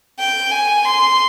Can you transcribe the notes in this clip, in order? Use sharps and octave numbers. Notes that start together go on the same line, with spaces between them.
G5
G#5
C6